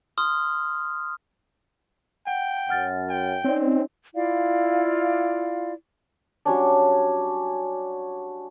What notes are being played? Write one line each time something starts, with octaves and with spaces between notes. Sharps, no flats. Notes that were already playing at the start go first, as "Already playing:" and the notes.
C6 D#6 F6
F#5 G5
F#2 F#5 F6 A6
G5
C4 C#4 D#4 C#5 D5
E4 F4 D5 F5
F#3 G3 C#4 D4